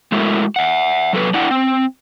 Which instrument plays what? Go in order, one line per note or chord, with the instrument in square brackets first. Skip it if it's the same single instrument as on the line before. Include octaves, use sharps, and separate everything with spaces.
[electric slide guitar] G#3 A3 E4 F#4 A4 A#4
E5 F#5
F#3 A4 B4
D4 E4 F#5 G5
C4